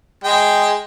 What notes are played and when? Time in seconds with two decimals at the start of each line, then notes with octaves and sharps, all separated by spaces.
0.24 G#3 G5